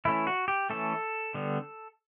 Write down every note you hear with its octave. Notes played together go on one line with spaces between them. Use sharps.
E3 A3 C#4 E4
F#4
G4
E3 A3 C#4 A4
D3 G3 B3